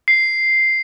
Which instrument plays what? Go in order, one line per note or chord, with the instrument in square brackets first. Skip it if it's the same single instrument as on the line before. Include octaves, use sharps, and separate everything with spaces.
[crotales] C7